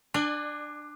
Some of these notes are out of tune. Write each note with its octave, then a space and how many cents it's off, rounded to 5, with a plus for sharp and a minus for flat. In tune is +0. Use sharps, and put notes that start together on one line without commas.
D4 +15 D5 +35 G#5 -20